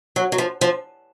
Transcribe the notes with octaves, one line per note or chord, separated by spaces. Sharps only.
F#3
F#3
F3
F3